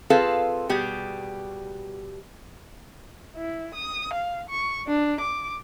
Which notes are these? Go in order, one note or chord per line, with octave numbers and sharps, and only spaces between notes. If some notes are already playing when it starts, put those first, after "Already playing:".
C4 F4 G#4 A4 B4 F5
B2 G3 G4 G#4
E4
D#6
F5
C#6
D4
D6